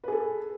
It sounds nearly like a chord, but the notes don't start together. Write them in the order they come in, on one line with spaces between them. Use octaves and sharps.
B4 G#4 A4